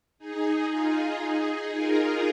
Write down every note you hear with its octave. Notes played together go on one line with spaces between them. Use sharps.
D#4 G#4
F4
D#4 G#4
F4 A#4